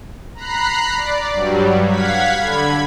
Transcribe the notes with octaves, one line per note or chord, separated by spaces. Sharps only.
A#5 B5 F#6 C7
D5
G2 F#3 G3
F5 F#5 G#6 B6
D3 B5 G#6